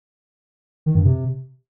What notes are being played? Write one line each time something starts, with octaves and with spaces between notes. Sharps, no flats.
D#3
G2
C3